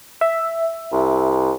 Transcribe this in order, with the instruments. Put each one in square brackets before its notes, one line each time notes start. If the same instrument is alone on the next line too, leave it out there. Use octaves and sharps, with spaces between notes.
[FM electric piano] E5
[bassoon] C2